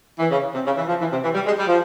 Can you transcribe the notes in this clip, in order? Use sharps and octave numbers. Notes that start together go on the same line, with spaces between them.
E3
C#3
C3
C#3
E3
F3
E3
C3
E3
G3
G#3
G3
F3